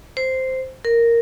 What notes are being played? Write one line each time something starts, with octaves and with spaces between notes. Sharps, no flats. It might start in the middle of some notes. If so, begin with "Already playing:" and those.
C5
A#4